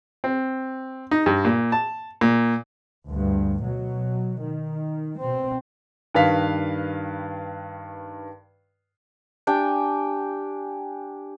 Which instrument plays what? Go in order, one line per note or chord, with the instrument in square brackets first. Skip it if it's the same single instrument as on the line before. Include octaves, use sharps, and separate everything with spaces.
[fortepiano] C4
D#4
G2
A#2
A5
A#2
[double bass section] D2 G2
B2 F#3
D#3
B2 C4
[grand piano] G2 D#3 B4 F5 B6
[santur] D4 G4 G5 G#5